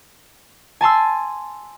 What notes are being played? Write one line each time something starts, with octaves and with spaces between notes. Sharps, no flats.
G#5 A5 C6 E6